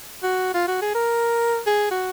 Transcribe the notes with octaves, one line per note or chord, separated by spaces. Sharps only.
F#4
F4
F#4
G#4
A#4
G#4
F#4